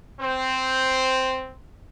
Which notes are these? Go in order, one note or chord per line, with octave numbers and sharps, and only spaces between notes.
C4 C5